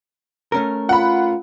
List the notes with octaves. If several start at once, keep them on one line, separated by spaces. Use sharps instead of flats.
A3 C#4 A#4
F4 F#5 B5